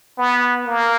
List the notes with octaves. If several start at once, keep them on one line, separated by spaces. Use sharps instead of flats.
B3
A#3